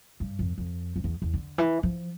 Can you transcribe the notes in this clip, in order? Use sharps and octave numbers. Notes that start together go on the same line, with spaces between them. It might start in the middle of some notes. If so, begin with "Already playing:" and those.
G2
F2
F2
F2
E2
E2
D3
E3
F3